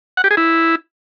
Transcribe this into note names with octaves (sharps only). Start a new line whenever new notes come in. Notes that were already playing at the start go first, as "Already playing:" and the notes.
F#5
G4
G#4
E4